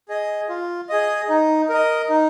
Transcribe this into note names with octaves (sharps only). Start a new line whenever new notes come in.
G#4 D#5
F4
G#4 D#5
D#4
A#4 D#5
D#4